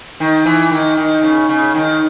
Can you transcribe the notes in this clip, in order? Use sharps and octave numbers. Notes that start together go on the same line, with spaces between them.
D#3
E3
D#3
D#3
C#3
C#3
D#3